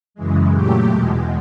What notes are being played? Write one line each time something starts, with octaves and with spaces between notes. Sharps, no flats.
F#2 C#3 E3 G#3
A#2 F#3 A3 G4
E2 B2 G#3